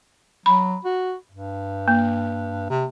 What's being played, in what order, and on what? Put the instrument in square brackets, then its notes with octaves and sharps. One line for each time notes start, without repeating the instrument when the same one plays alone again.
[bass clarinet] F#3 [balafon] B5
[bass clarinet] F#4
G2
[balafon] A#3
[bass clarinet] C3